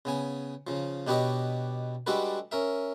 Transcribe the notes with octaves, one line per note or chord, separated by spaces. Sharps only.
C#3 B3 G#5
C#3 F3
B2 D4 G4 B4 C#5 D#5
G3 G#3 D4 F#4 A4 B4
C#4 A#4 E5